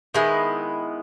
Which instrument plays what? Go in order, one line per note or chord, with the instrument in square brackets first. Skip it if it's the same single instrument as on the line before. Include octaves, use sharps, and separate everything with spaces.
[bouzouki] D#3 G#3 B3 E4